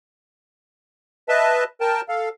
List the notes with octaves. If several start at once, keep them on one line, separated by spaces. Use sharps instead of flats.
B4 D#5 E5 A5
A#4 G5 A5
A4 F5